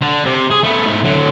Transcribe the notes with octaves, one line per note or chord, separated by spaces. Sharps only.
D3
C3
G#4
A3 B3
G#2 A3
D3 F#3